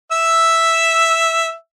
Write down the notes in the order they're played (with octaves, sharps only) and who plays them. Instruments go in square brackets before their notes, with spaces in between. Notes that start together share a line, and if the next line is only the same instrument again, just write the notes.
[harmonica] E5 E6